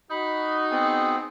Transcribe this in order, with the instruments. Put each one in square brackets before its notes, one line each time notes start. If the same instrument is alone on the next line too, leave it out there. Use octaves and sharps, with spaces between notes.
[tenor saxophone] D#4 [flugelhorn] F#4 [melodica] B5
[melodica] B3 C4 G#4